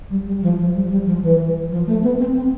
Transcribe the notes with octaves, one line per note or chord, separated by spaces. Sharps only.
G3
G3
F3
F3
G3
G3
F3
E3
F3
A3
B3
C4
C4